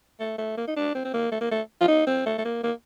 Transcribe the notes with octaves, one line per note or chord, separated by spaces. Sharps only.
A3
A3
A#3
D#4
D4
C4
C4
A#3
A3
A#3
A3
F4
D#4
C4
A3
A3
A#3
A#3